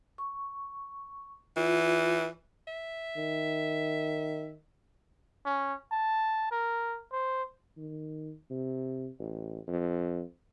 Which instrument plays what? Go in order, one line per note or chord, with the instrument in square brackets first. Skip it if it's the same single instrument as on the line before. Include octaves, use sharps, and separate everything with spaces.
[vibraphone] C#6
[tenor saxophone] E3 [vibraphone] F4
[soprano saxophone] E5
[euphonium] D#3
[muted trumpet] C#4
A5
A#4
C5
[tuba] D#3
C3
A1
F2